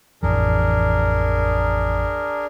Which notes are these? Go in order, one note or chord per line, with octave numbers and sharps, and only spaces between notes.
A1 F2 E3 D4 G#4 A#4